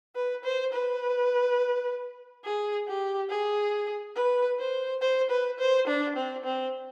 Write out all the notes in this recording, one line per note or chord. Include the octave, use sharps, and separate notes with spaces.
B4
C5
B4
G#4
G4
G#4
B4
C5
C5
B4
C5
D4
C4
C4